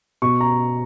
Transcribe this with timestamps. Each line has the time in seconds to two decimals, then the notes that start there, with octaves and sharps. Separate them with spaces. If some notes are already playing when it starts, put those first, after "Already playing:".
0.22 B2 C#6
0.41 A#5